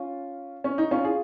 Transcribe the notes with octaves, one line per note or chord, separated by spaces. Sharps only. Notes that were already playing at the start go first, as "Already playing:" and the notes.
Already playing: C#4 F4
C#4
D#4
C#4 F4
F4 G#4